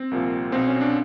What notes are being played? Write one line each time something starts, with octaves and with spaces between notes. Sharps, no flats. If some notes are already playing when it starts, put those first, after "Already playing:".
Already playing: C4
C2 A#2 F3
B1 B2 C4
C#4
D4